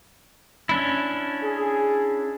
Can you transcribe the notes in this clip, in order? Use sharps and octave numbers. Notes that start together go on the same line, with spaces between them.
C#4 D4 E4
G#4